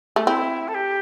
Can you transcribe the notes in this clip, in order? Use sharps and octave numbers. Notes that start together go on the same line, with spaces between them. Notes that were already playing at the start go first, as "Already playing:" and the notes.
A3
C4 E4
A4
G4